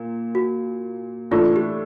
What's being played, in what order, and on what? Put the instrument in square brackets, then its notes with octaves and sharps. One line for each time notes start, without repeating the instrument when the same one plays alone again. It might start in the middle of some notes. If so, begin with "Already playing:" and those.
Already playing: [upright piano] A#2
[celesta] F#4
[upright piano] A2 E3 A3 D4 [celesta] F4
[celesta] G4